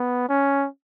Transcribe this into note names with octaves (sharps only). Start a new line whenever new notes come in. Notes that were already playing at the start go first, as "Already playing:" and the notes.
Already playing: B3
C#4